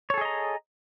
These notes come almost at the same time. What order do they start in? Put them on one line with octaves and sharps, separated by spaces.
C#5 A4 G#4 D#5 A#5